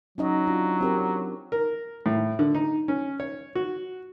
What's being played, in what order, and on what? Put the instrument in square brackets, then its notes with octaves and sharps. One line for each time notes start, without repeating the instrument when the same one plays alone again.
[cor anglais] F#3 [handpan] C#4 D#4 D#5
[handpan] D4 F4
C4 G4 A#4
[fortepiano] A#4
A2
D3
D#4
C#4
C#5
F#4